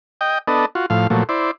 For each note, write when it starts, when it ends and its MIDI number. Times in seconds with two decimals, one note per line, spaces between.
0.21 0.38 75
0.21 0.38 79
0.48 0.66 59
0.48 0.66 62
0.48 0.66 69
0.48 0.66 75
0.75 0.86 65
0.75 0.86 66
0.90 1.07 45
0.90 1.07 53
0.90 1.07 77
1.10 1.24 46
1.10 1.24 53
1.10 1.24 54
1.10 1.24 57
1.29 1.51 64
1.29 1.51 72
1.29 1.51 74